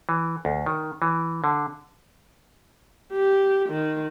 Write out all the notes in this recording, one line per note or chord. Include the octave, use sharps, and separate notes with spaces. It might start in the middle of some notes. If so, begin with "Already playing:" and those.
E3
D2
D#3
E3
D3
G4
D#3